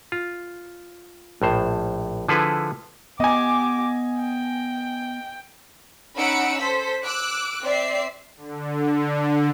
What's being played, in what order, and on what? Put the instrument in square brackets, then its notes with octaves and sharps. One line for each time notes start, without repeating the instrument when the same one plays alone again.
[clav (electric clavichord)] F4
A#1 A2 C5
D3 F3 E4 G#4 A4 B4
[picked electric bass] B3 [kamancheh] G4 D6 [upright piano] D#5 G#5
[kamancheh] G5
[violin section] C#4 D#4 F#5 B5 E6 D7
A4 C5 B6
D6 E6 F#6 D7
C4 D5 E5 C7
[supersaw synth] D3